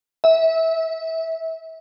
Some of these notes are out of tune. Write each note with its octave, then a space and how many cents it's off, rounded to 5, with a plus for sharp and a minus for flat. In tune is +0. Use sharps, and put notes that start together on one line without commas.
E5 -25